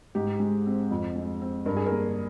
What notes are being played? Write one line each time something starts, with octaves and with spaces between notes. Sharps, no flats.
G#2 G4
G#3
C4
F2
G#3
C4
G2 A#4
G#4
A#4
A#3